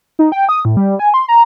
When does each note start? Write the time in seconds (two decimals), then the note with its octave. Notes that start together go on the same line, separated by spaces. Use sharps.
0.19 D#4
0.32 G5
0.49 D#6
0.65 A2
0.77 G3
0.99 G#5
1.14 C6
1.29 A#5